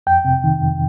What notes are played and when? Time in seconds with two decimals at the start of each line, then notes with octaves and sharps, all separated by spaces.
0.07 F2 G5
0.25 C3
0.44 D#3
0.62 F2